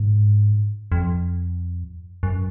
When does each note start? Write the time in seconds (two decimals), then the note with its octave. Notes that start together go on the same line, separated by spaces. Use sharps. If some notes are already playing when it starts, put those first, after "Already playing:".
Already playing: G#2
0.92 F2
2.23 F#2